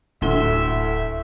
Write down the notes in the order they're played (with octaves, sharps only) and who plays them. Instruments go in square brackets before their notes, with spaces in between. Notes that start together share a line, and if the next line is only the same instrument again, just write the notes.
[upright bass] D1 [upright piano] D2 A2 G7 [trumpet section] E5